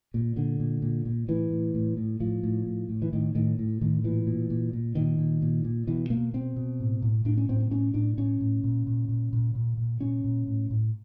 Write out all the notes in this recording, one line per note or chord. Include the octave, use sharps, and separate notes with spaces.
A#2
A#2 D3
A#2
A#2
A#2
A2 E3
A2
A2
A2
A2 F3
A2
A2
A2
E3
A2 D#3
A2 D#3
A2
A2 D#3
A#2 E3
A#2
A#2
A#2
A#2 D#3
A#2
A#2
A#2
B2 E3
B2 A#3
B2 C4
B2
A2
A2
A2 D4
C#4
A2 C4
C4
A2 C#4
A2 D4
A2 C#4
A2
A#2
A#2
A#2
A#2
A#2
A#2
A#2 C#4
A#2
A2
A2